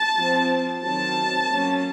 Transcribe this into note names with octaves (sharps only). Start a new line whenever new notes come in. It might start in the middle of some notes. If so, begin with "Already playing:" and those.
Already playing: A5
F3 C4
D#3 F#3 C4 A5
F#3 A#3 C#4